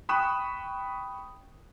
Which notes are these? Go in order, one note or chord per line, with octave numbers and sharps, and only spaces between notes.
G5 B5 C#6 D#6 F#6 E7